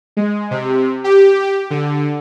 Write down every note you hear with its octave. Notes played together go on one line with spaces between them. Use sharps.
G#3
C3
G4
D3